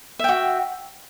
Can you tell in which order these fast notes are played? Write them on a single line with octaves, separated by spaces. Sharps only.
E5 G5 F#4